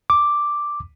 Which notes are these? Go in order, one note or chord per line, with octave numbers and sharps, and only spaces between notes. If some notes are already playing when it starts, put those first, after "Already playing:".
D6